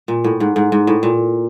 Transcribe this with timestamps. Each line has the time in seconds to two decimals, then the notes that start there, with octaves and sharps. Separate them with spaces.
0.08 A#2
0.24 A2
0.40 G#2
0.56 G#2
0.72 G#2
0.87 A2
1.03 A#2